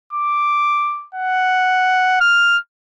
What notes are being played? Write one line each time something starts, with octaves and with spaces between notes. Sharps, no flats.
D6
F#5
F6